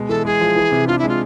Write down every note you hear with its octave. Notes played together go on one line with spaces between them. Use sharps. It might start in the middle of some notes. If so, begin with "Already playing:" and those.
Already playing: B2 G#3
E3 A4
G#3 G#4
F3
E3
C3
D4 F4
G#3 E4
F4